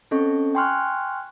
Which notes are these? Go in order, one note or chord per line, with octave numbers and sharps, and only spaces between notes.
C4 C#4 A4 D#5 C#6
G5 G#5 C6 C#6 F6 F#6